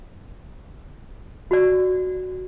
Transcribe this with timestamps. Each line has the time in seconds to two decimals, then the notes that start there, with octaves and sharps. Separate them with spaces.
1.51 F#4 D5